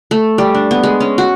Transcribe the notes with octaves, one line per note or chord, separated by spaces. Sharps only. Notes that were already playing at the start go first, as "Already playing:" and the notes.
A3
G3
D4
B3
G#3
C#4
F#4